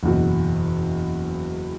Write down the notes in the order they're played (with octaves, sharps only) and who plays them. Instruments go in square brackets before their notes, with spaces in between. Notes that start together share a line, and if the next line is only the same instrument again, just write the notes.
[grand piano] F#1 E2 B2